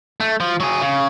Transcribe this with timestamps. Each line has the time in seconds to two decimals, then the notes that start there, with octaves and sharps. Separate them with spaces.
0.20 A3
0.40 F3
0.60 F#3 G#4
0.82 C#3